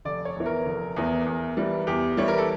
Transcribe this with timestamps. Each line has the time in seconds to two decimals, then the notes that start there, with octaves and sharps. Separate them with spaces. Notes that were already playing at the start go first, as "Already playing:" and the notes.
0.05 F1 D5
0.25 C#5
0.36 E2 E3
0.46 A#4
0.66 F1
0.96 E2 E3
1.26 E2
1.57 E3 G3
1.87 E2 G4
2.17 E3 G3 C#5
2.28 A#4
2.38 A4